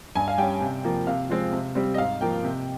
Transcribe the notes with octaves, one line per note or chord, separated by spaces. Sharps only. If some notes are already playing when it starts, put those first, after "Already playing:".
G2 G#5
F5
G3 C#4 G5
C3
F3 A#3
C3 F5
F3 G#3 C4
C3
G3 C4
D#5
G#2 F5
F3 A#3 G5
C3